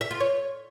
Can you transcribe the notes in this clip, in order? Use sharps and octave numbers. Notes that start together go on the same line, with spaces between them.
E5
F4
C#5